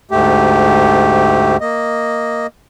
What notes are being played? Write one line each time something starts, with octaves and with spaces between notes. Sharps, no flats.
D2 G#2 A3 G4
A#3 D#5